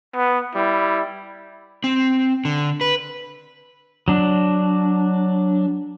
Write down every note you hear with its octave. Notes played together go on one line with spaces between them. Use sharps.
B3
G3 E4
C4
D3
B4
F#3 D4